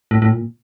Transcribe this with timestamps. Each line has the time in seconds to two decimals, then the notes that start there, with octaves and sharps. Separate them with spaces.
0.11 A2
0.22 A2
0.31 A#2